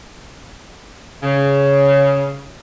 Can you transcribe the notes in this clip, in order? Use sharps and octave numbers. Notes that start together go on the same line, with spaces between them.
C#3